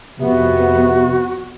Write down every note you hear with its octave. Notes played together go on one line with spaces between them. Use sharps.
F2 C3 B3 F#4